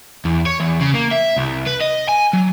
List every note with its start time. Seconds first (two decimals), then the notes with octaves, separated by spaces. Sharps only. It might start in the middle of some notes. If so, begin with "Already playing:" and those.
0.25 E2
0.46 C#5
0.60 E2
0.80 C#3
0.94 A#3
1.11 E5
1.36 C2
1.66 B4
1.81 D#5
2.09 G#5
2.33 F#3